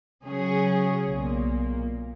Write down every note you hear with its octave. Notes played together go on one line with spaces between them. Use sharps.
C#3 F#3 C#4 G#4
B1 A#2 A#3